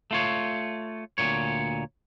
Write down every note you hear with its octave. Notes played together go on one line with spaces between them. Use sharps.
A3 F4 C#5
D2 A#2 C#5